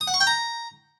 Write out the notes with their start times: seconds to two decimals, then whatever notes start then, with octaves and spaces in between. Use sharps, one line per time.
0.01 D#6
0.07 F#5
0.14 C#6
0.20 G5
0.27 A#5